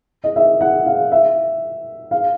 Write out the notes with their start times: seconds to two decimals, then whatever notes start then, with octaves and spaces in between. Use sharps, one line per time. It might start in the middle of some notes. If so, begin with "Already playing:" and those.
0.24 D#5
0.36 E5
0.61 F#5
0.87 F5
1.12 E5
2.11 F5